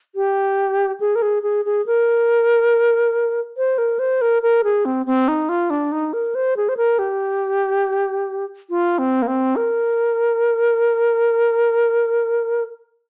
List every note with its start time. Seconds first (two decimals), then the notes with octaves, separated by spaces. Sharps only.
0.15 G4
1.00 G#4
1.15 A#4
1.22 G#4
1.43 G#4
1.65 G#4
1.86 A#4
3.57 C5
3.78 A#4
3.99 C5
4.21 A#4
4.42 A#4
4.64 G#4
4.85 C4
5.06 C4
5.28 D#4
5.49 F4
5.70 D4
5.92 D#4
6.13 A#4
6.35 C5
6.57 G#4
6.69 C5
6.77 A#4
6.99 G4
8.70 F4
8.98 C4
9.22 A#3
9.27 C4
9.56 A#4